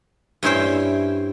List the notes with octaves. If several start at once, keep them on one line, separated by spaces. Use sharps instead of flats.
G2 C#4 E4 C5 C#5 G5